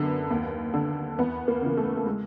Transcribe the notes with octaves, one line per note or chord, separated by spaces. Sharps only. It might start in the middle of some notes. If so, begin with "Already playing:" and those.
Already playing: F#2 D3 B3
D#2
D3
E2 B3
A#3
C#3 E3
A3
A3
G#3